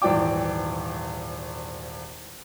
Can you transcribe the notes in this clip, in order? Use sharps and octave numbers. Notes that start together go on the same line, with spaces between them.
D#1 G#1 E3 D5 G5 D6